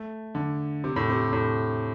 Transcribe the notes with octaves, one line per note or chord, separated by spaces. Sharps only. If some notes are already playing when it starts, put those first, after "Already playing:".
Already playing: A3
D3
C3
A2
C3
A2